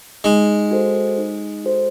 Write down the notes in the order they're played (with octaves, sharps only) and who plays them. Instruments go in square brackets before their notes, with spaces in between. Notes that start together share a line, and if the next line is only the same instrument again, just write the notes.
[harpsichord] G#3 [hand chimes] D#4
[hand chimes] F#4 A4 C5
D#4
F#4 A4 C5